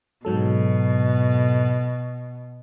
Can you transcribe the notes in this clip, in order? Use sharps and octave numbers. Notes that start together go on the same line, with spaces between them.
G#2 B2 F#3 A4